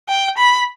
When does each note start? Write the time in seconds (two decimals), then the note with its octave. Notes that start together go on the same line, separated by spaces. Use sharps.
0.09 G5
0.38 B5